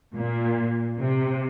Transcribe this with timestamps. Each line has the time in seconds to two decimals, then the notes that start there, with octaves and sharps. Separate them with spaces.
0.16 A#2
0.98 C3